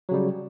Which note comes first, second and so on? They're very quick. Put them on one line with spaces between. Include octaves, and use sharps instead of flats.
F#3 C#3 G3